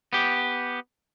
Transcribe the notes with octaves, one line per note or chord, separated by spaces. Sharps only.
B3 G4